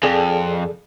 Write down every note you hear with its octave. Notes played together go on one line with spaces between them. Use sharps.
F2 G#4 A4 D5